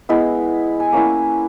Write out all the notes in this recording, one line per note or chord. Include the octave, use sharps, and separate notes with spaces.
G#3 B3 E4
G#5
A#3 C#4 E4 F#5